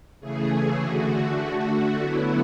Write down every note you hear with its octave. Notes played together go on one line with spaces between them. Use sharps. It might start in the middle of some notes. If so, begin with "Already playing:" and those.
C#3 E3 A3 G#4
D3 A3 F#4
D3 A3
D3 F#3 B3 E4